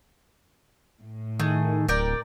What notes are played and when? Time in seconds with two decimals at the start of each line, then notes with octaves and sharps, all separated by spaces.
0.99 A2
1.39 D#3 A3 G#4
1.88 D1 A#4 D5 G5